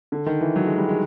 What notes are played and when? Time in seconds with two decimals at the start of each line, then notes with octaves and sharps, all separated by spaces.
0.12 D3
0.26 D#3
0.41 E3
0.56 F#3
0.67 G#3
0.78 G3
0.89 G#3